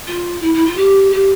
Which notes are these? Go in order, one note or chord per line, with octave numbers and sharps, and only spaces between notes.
F4
E4
E4
F4
G4
G4